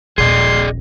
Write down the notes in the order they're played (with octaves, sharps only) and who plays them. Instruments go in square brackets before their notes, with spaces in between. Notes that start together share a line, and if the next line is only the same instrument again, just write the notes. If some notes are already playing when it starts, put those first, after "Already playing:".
[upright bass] D#1 A#1 [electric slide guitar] G#4 D5 D#5 [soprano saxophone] C6